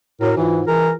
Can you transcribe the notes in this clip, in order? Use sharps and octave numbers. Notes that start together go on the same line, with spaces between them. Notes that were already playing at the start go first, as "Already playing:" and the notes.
A2 F#4 A#4 C#5
G#2 E3 E4 F4
E3 G#4 A#4